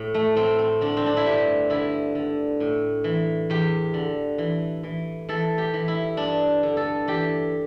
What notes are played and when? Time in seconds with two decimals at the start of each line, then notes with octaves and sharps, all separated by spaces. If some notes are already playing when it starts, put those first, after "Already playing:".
Already playing: A2
0.14 A3
0.36 A2 C4
0.59 C4
0.81 D3 D4
0.97 C4
1.06 D4
1.17 E4
1.25 G2 G4
1.70 D3 E4
2.15 D3
2.60 A2
3.04 E3
3.50 E2 G4
3.94 D3
4.38 E3
4.83 E3
5.29 E3 A4
5.58 G4
5.74 E3
5.88 E4
6.17 G2 D4
6.63 D3
6.77 A4
7.08 E3 G4